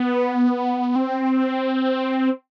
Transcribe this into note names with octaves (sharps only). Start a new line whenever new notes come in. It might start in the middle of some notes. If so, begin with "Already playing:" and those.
Already playing: B3
C4